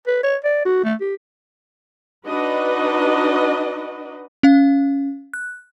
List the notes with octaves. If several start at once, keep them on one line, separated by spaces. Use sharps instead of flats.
B4
C#5
D5
F#4
A3
G4
D4 D#4 F#4 B4 D#5
C#4 F5
F#6